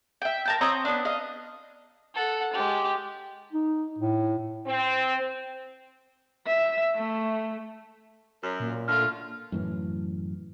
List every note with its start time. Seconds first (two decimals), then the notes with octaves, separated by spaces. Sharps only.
0.22 E5 G5
0.46 A#4 A5 G6
0.61 C4 C#5 D#5 A#5
0.85 B3 D4
1.05 D#5 F5
2.15 A4 F#5
2.53 G#3 G4
3.53 D#4
3.99 A2
4.67 C4
6.47 E5
6.96 A3
8.43 F#2
8.60 A#2
8.88 D3 A3 F4 F6
9.52 F#2 A2 E3